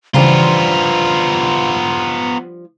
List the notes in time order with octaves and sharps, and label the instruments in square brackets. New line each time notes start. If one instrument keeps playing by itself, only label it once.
[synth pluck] C#3 E3 [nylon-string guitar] F3 G3 D4 [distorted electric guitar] B3 F4 [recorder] A#5